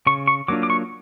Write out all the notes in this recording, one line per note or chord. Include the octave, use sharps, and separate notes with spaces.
C#3 C#6
C#6
F#3 A#3 D4 F4 D6
D6
C#6